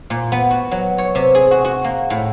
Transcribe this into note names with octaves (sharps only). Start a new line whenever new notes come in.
A#2
B3
F#4
F#3
C#5
C3
G#4
F#4
F#4
A#3
A2